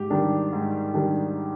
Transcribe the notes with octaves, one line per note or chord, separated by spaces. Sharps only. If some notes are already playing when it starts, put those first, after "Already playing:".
Already playing: G#2 G4
D#3 G3 D4
G#2
D#3 G3 D4